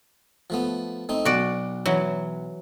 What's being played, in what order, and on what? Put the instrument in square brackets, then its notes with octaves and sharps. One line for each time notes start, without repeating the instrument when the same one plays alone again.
[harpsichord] F3 A3 B3
A3 C4 D#4
[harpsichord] B1 [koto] F#4 D5
[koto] E3 F#3